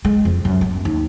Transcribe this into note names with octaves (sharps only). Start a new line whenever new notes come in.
G#3
F2
F#2
B3
D#2